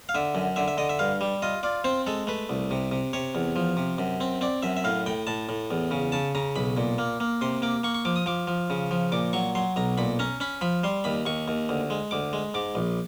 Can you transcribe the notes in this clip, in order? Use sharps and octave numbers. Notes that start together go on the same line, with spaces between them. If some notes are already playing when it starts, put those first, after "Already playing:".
F5
D3 E5
F#2
D3 E5
E5
D3 D#5
E5
G2 F5
G3
F4 D#5
F4 D5
C4 C5
G#3 A4
A3 B4
C2
C3
C3
C3 C#5
E2
F3
C3
F#2
C4
C4 D5
F#2 E5
E5
A2 F5
A2 G5
A2 A5
A2
E2
C#3
C#3 A5
C#3 A#5
B1 B5
A#2
A#3
A#3
C3 C6
A#3 D6
A#3 C#6
C#6
F3 D6
D#6
F3 D6
F3
C#3
F3
A#2 D6
F#3 C#6
F#3 C6
B1 A#5
A#2 B5
C#4 A#5
C#4 B5
F3 B5
G3 C6
D#2 B5
D#2 C#6
D#2
D2
G#3
D2 D6
G#3
G#2 D6
A#1